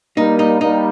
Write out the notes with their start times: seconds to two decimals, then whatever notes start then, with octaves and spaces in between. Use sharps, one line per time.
0.17 G3 A#3 D#4
0.39 D#4
0.61 G3 A#3 D#4